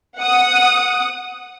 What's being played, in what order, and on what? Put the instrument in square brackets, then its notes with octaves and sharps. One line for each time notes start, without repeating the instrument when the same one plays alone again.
[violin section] F#5 D#6